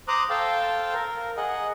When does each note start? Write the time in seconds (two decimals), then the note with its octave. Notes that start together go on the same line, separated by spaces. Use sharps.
0.08 C5 A#5 D6 D#6 F#6
0.30 A4 C5 F5 G5 A5
0.94 A#4
1.37 G#4 D#5 F#5